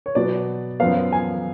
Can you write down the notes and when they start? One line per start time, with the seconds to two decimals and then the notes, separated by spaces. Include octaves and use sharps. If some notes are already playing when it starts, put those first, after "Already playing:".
0.06 C#5
0.15 B2 F#3 B3 D5
0.80 F#2 F3 B3 F5
1.13 G#5